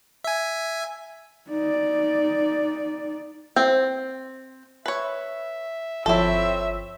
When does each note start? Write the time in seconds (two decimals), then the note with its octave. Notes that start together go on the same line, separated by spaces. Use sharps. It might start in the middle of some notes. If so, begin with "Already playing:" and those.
0.24 E5 G#5
1.50 D#4 D5
3.56 C4
4.86 B4 C#5 E5
6.06 G1 F3 C4 E4 A4 C#5 E5